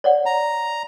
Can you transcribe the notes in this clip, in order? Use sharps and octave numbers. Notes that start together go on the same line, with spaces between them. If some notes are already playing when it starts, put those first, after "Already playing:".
C#5 D5 F#5
A#5